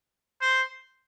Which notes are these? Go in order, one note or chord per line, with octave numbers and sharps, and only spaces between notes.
C5